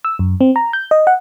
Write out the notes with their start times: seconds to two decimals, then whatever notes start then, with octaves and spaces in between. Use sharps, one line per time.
0.05 E6
0.19 F#2
0.41 C4
0.56 A#5
0.73 G6
0.91 D#5
1.07 F#5